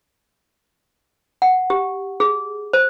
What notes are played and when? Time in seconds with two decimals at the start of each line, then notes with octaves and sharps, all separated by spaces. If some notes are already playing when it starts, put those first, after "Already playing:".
1.42 F#5
1.70 G4
2.20 G#4
2.73 C5